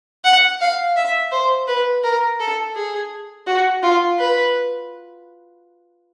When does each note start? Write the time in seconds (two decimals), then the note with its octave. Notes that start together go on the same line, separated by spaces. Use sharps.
0.24 F#5
0.61 F5
0.96 E5
1.32 C5
1.68 B4
2.04 A#4
2.40 A4
2.75 G#4
3.47 F#4
3.83 F4
4.19 B4